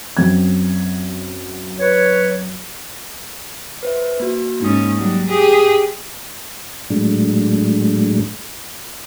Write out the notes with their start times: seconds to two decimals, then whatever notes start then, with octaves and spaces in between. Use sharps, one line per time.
0.17 F#2 C4 G#6
1.80 B4 C#5
3.83 B4 C5 E5
4.20 A#3 F#4
4.60 G#2 A#3 C#4 D#4 D#6
4.98 F#3 G3
5.30 G4 G#4 D#6
6.90 A2 F#3 G#3 A3 D4